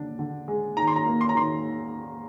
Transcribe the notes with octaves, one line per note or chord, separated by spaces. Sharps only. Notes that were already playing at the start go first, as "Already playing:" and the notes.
Already playing: D3 D4
D3
G#3
D#3 A#5
C6
A#5
A#3
C6
A#5
D#3 C6